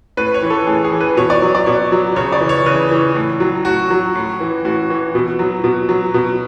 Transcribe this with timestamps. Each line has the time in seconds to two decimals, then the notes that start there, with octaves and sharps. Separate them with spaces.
0.17 A2 B4
0.34 C#5
0.42 E3
0.50 A4
0.67 A2 G#4
0.85 G#4
0.92 E3
1.00 B4
1.17 B2 C#5
1.30 D5
1.42 F#3
1.55 D5
1.66 B2 C#5
1.92 F#3
2.16 C#3 C#5
2.32 D5
2.41 E3
2.49 C#5
2.66 C#3 B4
2.91 E3
3.15 A2
3.40 F#3
3.65 A2 F#4
3.90 F#3
4.15 A2
4.40 E3
4.65 A2 F#4
4.90 E3
5.15 B2
5.39 F#3
5.64 B2
5.89 F#3
6.14 B2